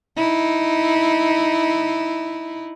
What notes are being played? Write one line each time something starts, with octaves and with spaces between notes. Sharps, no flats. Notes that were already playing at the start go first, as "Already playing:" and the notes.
D#4 E4